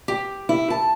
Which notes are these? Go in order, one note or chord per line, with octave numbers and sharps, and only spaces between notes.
G4
E4
A5